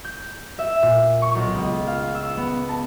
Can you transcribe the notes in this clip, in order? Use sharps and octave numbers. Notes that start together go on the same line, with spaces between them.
G6
E5
A#2
C#6
B1
C#2
F5
E6
B3
A5